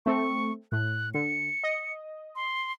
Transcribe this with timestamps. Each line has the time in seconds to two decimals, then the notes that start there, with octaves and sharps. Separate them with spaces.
0.06 A3 C4 A4 C#6
0.72 A2 F#6
1.14 D3 C#7
1.64 D#5
2.35 C6